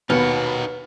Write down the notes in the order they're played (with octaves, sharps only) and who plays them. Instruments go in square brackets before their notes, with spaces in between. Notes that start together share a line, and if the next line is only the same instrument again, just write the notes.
[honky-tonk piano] D#2 B5 F6 [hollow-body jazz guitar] B2 [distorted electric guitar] D#4 F#5 [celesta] B4